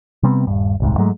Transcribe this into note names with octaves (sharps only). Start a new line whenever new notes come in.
C3 G3 B3 C4
D#1 G2
D#1 C2 G#2
G#2 F#3 G#3 A3